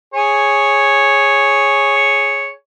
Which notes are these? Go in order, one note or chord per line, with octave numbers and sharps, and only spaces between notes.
G#4 C#5